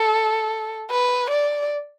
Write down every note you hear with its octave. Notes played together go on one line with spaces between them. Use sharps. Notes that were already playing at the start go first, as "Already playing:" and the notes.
Already playing: A4
B4
D5